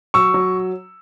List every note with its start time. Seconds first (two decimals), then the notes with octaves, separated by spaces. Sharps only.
0.14 F#3 C#6 E6
0.34 F#3